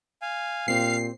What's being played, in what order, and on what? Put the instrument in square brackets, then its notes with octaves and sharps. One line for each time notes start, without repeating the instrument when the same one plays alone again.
[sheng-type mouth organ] F5 G#5
[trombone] A#2 [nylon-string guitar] C4 G4 [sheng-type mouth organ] F5 [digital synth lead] C7